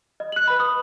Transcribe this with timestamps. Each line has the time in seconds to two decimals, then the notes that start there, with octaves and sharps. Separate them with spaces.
0.20 D#5
0.32 F#6 F#7
0.48 B4 B5
0.60 D#6